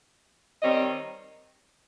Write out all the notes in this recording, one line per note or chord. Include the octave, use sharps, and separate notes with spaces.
D#3 G3 C4 C#5 D#5